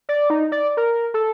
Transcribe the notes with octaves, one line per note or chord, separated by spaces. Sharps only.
D5
D#4
D5
A#4
A4